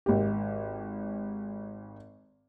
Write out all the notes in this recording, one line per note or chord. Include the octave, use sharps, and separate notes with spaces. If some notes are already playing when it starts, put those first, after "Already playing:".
G#1 G4